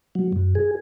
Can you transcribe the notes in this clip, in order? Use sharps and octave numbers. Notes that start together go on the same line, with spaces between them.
F#3
F#2
G#4